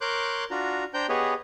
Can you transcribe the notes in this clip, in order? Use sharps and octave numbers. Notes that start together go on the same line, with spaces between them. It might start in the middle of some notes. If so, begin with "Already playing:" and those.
A#4 C#5 C6 D6 F#6 G6
D4 F4 F#4 A#5
D4 C5 G5 A#5 G6
B3 G4 G#4 B4 C#5 D#5